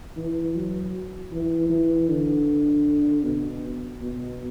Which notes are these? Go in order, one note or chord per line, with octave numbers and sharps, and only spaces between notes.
E3
F#3
E3
E3
D3
B2
B2